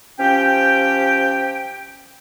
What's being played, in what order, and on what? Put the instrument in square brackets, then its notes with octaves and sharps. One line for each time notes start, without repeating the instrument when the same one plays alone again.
[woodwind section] F3 C#4 G4 G5